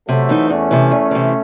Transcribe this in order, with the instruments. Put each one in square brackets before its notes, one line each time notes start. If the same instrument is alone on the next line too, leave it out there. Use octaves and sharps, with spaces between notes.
[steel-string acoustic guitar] C3 [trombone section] F#3 A3
[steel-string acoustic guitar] E3 C4 D#4
[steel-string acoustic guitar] E2 [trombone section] A3 C#4
[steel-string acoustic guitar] C3 E3
E2
C3 E3